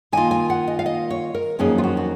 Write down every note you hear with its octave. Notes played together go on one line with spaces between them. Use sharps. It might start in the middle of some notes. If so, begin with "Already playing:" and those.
D#3 A#3 F4 G#5
G#5
F#5
D#5
F5
D#5
C#5
A#4
F2 D#3 F#3 A#3 C#4 G#4
F4
F#4
F#4